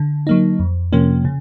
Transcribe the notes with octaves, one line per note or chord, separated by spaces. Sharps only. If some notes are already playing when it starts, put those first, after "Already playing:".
Already playing: D3
F#3 A#3 D#4
F2
C3 F3 A#3 C#4
C#3